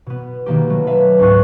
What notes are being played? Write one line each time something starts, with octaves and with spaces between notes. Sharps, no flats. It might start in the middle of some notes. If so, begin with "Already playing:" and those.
B2 B3
B2 D#3 A#3 G4
F#3 A3
B4 E5 F5
C#2 G#2 C#4 G#4 C#6 F#6